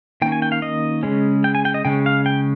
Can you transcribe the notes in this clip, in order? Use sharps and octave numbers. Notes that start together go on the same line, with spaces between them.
D#3 A#3 C#4 G5
G#5
G5
F5
D#5
C#3 G#3 C#4
G5
G#5
G5
D#5
C#3 G#3 C#4 G5
F5
G5